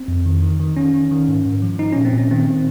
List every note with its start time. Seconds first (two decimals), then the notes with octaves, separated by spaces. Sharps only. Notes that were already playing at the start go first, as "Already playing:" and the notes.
Already playing: C4
0.08 F2
0.26 D#3
0.43 D#3
0.60 D#3
0.77 D#3 C#4
0.94 D#3
1.11 D#3
1.28 G#2
1.46 G#2
1.62 F3
1.79 F3 D#4
1.93 A#2 C#4
2.05 C4
2.13 A#2 C#4
2.31 D#3 C4
2.48 D#3